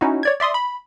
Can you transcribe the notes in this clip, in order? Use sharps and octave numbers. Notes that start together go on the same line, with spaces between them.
C#4 D#4 E4 F#4
C#5 D5 G#6
D5 E5 C6 D#6
B5